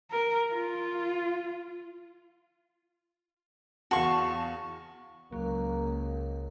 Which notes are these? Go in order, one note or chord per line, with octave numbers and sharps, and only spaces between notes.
A#4
F4
E2 F#4 F5 A5 C#6
C#2 F#3 A#3